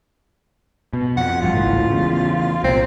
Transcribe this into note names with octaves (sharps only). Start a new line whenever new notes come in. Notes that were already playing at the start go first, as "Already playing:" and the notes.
B2
F2 F#5
A1 G2 F4
G#1 C#2 A2
E2 C#3
C2 A#2 C4